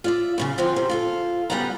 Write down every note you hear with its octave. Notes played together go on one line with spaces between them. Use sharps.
F4 D5 E5
F#2 A2 C#3
D3 F3 C4 F4
C3 G3
F4 F#4 A4
F#2 C#3 G3 B3 F#5 A#5